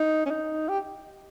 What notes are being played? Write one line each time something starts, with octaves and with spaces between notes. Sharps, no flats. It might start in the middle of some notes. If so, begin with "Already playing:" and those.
Already playing: D#4
C#4
D#4
G4